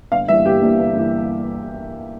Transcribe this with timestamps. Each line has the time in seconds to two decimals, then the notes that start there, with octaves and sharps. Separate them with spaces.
0.12 G1 F5
0.28 G2 E3 A#3 E5
0.46 G1 G4
0.61 G2 E3 A#3
0.78 G1
0.97 E3 A#3